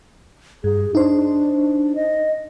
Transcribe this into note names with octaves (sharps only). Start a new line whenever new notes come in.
G2 G#4
D4 D#4 C5
D#5